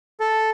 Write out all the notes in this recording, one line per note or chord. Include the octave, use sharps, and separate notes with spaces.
A4